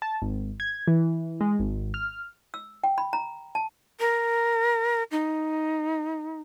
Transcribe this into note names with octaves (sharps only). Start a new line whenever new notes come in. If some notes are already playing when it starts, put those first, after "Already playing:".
A5
G#1
G#6
E3
G#3
G#1
F6
E6
G5
B5
A#5
A5
A#4
D#4